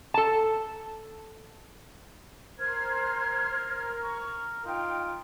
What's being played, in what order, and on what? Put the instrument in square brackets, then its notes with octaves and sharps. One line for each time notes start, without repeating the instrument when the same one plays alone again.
[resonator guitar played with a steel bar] A4 A5
[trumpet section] A#4 [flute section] C5 F6 G#6
[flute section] C#6
[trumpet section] D#4 F4 [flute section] G5